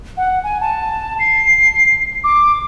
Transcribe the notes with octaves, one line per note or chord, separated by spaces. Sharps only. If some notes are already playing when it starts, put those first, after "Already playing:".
F#5
G#5
A5
C7
D6